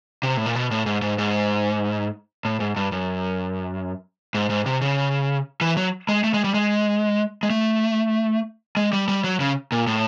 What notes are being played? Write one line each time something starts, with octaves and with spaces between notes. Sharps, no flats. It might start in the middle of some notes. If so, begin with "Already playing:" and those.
C3
A2
A#2
B2
A2
G#2
G#2
G#2
A2
G#2
G2
F#2
G#2
G#2
C3
C#3
E3
F#3
G#3
A3
G#3
G3
G#3
G#3
A3
G#3
G3
G3
F#3
C#3
A#2
A2